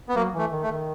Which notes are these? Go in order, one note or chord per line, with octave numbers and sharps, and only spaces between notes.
B3
F#3 A#3
E3 A3
D#3
A3
D#3